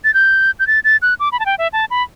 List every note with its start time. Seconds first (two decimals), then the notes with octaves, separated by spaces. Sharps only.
0.04 A6
0.14 G6
0.59 G6
0.67 A6
0.84 A6
1.02 F#6
1.20 D6
1.32 B5
1.40 A5
1.46 G5
1.58 E5
1.73 A5
1.90 B5